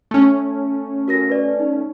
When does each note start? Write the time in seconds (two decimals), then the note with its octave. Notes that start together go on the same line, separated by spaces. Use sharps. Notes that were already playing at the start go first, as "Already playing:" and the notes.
0.11 A3 C#4
1.08 F#4 A#4 A#6
1.30 B4 D5
1.60 D#4